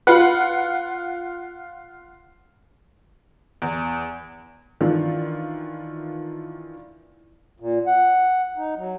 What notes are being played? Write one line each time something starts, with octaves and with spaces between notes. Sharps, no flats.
F4 B4 F#5
E2
D#3 E3 D4 F4
A#2
F#5
D#4
F#3